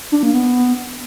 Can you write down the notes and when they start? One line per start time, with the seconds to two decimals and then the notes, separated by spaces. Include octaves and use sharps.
0.12 D4
0.23 A#3
0.34 B3